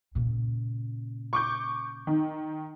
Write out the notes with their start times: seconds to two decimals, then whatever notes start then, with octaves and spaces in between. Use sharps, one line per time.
0.15 A#2 C#3
1.33 C#6 D6 G6
2.07 D#3